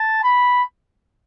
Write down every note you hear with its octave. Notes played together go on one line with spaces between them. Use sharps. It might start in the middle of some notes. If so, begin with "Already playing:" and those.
Already playing: A5
B5